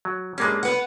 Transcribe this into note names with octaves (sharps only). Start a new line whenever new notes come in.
F#3
G2 G3 G#3 A#3 C#4
B3 B4 F#5